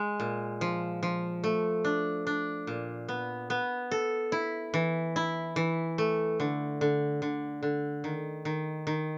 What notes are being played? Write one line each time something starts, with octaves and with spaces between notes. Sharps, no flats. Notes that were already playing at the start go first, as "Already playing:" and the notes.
Already playing: G#3
A#2
F3
F3
A3
D4
D4
A#2
B3
B3
A4
E4
E3
E4
E3
A3
D3
D3
D3
D3
D#3
D#3
D#3